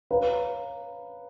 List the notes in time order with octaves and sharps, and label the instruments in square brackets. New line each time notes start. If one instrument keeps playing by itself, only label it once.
[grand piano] B4 [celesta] C#5 F5 A#5